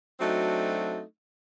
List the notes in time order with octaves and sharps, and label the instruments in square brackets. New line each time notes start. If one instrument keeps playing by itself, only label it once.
[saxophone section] F#3 A3 C4 D4 D#4 F#4